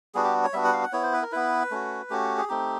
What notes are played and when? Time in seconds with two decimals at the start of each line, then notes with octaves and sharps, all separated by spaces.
0.14 G3 B3 D4 F#4 G#4
0.24 G4
0.44 C#5
0.53 G3 B3 D4 F#4 E5
0.64 F#5
0.73 F5
0.83 F#5
0.92 B3 E4 C#5
1.03 C5
1.13 B4
1.22 A#4
1.32 B3 E4 B4
1.71 A3 C#4 F#4
2.10 A3 C#4 F#4 G4
2.38 G#4
2.48 A3 C4 D#4 G4